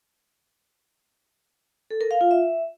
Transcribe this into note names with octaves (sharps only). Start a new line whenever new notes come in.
A4
A#4
F5
F4
E5